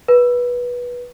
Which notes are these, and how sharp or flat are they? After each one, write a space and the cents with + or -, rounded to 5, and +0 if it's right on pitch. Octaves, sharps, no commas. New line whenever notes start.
B4 -20